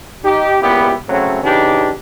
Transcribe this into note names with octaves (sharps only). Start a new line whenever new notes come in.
D#4 G4
C#2 A#2 B3 E4 G4
C#3 F#3 A3 C4 C#4
C#3 E3 D4 D#4 G4